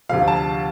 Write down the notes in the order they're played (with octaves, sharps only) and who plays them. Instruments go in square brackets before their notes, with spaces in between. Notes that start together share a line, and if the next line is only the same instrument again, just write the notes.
[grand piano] D2 C3 F3 F5
A5